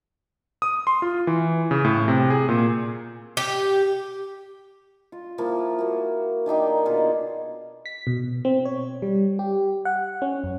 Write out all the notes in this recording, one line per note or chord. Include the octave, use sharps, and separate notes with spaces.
D#6
C6
F4
E3
C#3
A2
C3
G#4
A#2
G4
F4
F3 A#3 E4 F4
A#3 F#4
D#3 D4 D#4 G4
B2 F4 G#4 F#5
B6
B2
C4
C#5
G3
G4
F#5
C#4
F#2